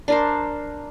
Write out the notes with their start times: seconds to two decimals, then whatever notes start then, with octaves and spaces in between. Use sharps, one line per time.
0.08 D4 A#4 C5